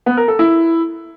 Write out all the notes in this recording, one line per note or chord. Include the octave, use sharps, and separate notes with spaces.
B3
A#4
A4
E4